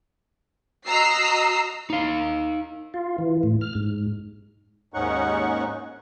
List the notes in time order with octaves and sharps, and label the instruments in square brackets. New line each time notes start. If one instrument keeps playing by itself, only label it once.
[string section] F#4 D#5 A#5 E6 C7
[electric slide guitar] D#4 F5
[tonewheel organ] F4
E3
A2
F6
G#2
[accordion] D#2 G#2 C#4 D#4 F#5 C#6